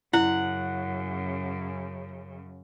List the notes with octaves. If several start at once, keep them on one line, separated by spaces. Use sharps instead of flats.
F#2 C#3 E4 F#5